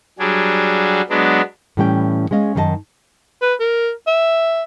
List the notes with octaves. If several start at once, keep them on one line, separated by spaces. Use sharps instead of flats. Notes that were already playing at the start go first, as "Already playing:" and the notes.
F#3 G3 D4 G#4
F#3 G#3 B3 D4
A2 E3 G3 C#4 F5 G5
G#3 C#4 D#5 F5
F#2 D#3 D4 G#4 D#5 A5
B4
A#4
E5